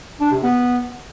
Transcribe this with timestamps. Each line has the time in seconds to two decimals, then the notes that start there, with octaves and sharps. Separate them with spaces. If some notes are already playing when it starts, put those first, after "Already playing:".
0.20 D4
0.32 C3
0.43 B3